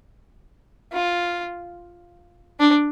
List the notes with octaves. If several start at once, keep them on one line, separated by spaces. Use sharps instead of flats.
F4
D4